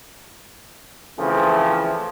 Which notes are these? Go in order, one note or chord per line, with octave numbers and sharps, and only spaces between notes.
C#3 E3 F3 A3 C4